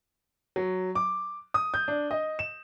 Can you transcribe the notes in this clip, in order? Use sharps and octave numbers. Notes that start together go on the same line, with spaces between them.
F#3
D6
D#6
G6
D4
D#5
E7